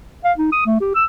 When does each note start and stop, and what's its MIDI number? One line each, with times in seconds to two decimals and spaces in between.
0.24 0.32 77
0.38 0.50 63
0.52 0.66 87
0.66 0.78 57
0.80 0.91 67
0.95 1.05 88